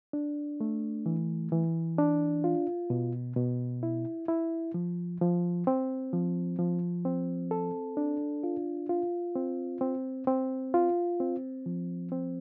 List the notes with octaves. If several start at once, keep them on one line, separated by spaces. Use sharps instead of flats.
D4
A3
E3
E3
D4
F4
B2
B2
E4
E4
F3
F3
C4
F3
F3
C4
A4
D4
F4
F4
C4
C4
C4
F4
C4
F3
C4